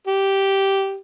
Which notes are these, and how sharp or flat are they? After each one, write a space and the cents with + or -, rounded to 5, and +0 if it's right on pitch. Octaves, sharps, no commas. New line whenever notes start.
G4 -10